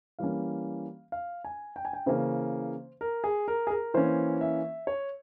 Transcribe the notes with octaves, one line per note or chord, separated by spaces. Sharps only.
E3 G3 A#3 C#4 F5
F5
G#5
G5
G#5
G5
C#3 E3 A#3 C#4 C5
A#4
G#4
A#4
G#4
A#4
E3 A#3 C#4 C5
E5
C#5